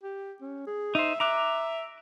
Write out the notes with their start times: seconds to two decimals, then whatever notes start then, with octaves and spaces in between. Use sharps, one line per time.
0.03 G4
0.41 C#4
0.67 G#4
0.95 D#4 C5 E5
1.20 E5 A#5 D6 F#6